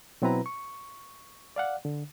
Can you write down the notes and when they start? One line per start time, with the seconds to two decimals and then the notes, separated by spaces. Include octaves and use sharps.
0.22 B2 F#3 C4 E4 B4 A#5
0.46 C#6
1.56 D5 F5 F#5
1.85 D3